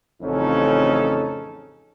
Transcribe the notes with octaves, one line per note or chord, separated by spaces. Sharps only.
A1 F2 C#3 C#4 D#4 A4